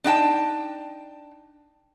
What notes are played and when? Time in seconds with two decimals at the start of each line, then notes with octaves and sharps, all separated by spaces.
0.04 D4 D#4 G5 A5